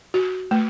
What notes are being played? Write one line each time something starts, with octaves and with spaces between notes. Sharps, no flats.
F#4
A3